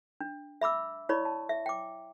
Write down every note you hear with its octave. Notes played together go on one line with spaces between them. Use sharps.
D4
E5 B5 D6 E6
E4 C#5 D5 B5 C#6
A5
E5
G5 D6